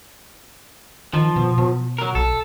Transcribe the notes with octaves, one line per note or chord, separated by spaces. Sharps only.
D#3 F3
B2
B2
F#3 A#4
B1 A4